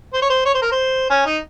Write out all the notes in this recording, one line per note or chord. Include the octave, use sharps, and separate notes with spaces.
C5
C#5
C5
C#5
C5
A#4
C5
C#4
D#4